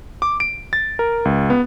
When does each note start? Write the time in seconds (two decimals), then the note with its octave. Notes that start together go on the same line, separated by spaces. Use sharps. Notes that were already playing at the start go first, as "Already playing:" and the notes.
0.22 D6
0.40 D7
0.73 A6
0.99 A#4
1.25 C#2
1.50 B3